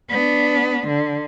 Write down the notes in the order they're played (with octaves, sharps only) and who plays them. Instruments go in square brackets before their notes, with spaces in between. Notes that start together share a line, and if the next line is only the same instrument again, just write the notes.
[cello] B3 D4
D3